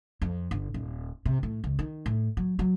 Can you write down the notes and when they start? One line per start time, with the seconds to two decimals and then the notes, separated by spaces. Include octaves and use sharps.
0.22 F2
0.51 G1
0.74 D#1
1.26 C3
1.43 A2
1.64 C#2
1.79 D#3
2.06 A2
2.37 F#3
2.59 F#3